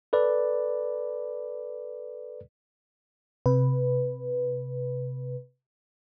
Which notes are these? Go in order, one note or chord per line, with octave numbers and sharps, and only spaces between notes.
A4 B4 D5
C3 B4